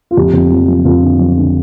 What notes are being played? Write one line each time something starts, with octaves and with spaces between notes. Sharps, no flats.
F4
F2 G4
F2
F3
F3
F2 F4
D3
F3
D3